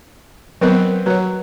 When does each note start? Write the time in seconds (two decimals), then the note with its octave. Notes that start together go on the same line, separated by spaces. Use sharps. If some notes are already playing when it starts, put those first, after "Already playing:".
0.61 F#3 B3 C4 A#4 D#5
1.06 F#3 B4 C#5